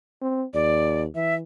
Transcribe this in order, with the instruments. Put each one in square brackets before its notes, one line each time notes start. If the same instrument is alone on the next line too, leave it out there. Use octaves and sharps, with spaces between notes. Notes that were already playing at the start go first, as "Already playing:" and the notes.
[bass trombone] C4
[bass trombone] D#2 [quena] D5
[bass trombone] E3 [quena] E5